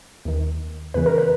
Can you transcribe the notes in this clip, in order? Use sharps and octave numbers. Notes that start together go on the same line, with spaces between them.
D#2 D#3
E2 C#3 E3 B4
A#4
B4